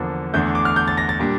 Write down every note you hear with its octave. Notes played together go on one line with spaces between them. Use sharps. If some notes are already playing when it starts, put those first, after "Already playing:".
Already playing: E2 D3 F3 A#3 D4
E2 D3 A3 D4 G6
D6
F6
G6
A6
A#6
A6
A#2 G3 D4